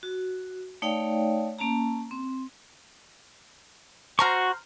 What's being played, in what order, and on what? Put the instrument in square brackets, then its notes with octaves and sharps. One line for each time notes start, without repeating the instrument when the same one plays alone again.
[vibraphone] F#4
A3 D#4 C#5 D5 F5 G5
A#3 C#4 A5 A#5
C4
[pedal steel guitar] F#4 C#6 [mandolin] C5 A#5 F6